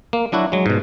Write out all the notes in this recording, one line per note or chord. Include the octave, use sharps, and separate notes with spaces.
A#3
F#3 D4 E4 F#4
F#3 G#3
G#2 B2